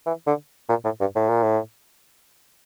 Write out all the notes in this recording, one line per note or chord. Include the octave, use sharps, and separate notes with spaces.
E3
D3
A#2
A2
G2
A2
A#2
A2